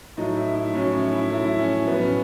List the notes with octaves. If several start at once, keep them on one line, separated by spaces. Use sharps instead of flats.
A2 F#3 D#4
E4
E4
A2 F#3 C#4
C#4
E4
A2 F#3 E4
E4
C#4
A2 F#3 B3
C#4